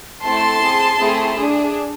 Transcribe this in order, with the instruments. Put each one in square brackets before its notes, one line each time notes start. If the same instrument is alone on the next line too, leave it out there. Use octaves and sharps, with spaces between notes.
[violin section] A3 C4 E4 A4 A5 C6
C4 G#4
A3 C4 E4 G#4
D4 G#4